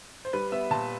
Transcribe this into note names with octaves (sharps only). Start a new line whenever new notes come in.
C5
G3 B4
B3 E5
A#2 A5